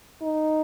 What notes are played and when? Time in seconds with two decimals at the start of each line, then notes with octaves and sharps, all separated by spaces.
0.22 D#4